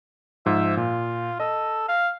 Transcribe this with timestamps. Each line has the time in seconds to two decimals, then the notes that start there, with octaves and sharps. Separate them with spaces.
0.46 G#2 F3 E5
0.77 A#2 F4
1.40 A4 D#5
1.88 F5